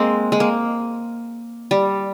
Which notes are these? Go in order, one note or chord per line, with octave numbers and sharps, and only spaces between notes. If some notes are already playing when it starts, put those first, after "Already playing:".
Already playing: G#3 A#3 C4
G#3
A#3
G3